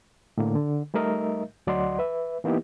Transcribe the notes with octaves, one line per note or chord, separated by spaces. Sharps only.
A2 D3 A#3
D3
G3 A3 D#4 A#4 D#5 E5
D2 F#3 D5 D#5 F#5 C6
B4 E5
E3 A#3 B3 D#4 E4 G4